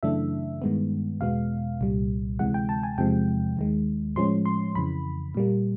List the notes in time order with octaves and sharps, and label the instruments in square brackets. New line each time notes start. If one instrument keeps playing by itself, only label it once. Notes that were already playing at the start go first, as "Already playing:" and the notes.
[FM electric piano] F#2 C#3 E3 A3 D4 E5
G2 D#3 G#3 B3
E2 B2 G#3 B3 F5
C2 A#2 G3
D2 C3 E3 G#3 F#5
G5
A5
G#5
E2 C3 F3 G#3 G5
D#2 D#3 G#3
A2 F3 G#3 C#4 C6
C6
F2 C#3 E3 B5
A#2 G3 A#3